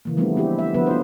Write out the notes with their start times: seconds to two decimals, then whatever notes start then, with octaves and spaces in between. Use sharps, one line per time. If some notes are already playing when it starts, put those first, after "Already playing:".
0.05 C#3 E3 A#3
0.17 F3 G3 A3 B3 C4 D4
0.37 G#3 C4 E4 G4
0.59 E5
0.74 D3 F3 F#3 B3 E4 B4
0.87 F4 C5